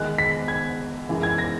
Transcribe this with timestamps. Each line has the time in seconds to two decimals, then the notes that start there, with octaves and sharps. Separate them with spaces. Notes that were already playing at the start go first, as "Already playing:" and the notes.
Already playing: E2 D#3 G#3 F#6
0.18 B6
0.48 G#6
1.09 F#2 E3 G#3
1.23 G#6
1.38 A#6